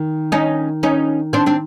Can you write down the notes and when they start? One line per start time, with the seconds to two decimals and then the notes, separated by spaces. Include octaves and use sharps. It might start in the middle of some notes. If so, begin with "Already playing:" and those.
Already playing: D#3
0.32 C#4 D#4
0.83 C#4 D#4
1.33 C4 D4
1.46 C4 D4